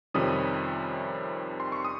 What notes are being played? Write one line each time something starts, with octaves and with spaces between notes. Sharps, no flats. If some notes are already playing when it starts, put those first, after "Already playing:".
F2 C3 D#3 G3 C#4 D#6
C6
C#6
D#6